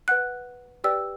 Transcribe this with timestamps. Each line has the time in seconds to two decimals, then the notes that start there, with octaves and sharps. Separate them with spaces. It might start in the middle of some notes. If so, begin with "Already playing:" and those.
0.08 B4 F#5 F#6
0.84 G4 B4 D5 G5 E6